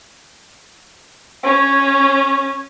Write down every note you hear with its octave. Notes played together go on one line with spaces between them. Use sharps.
C#4 C#5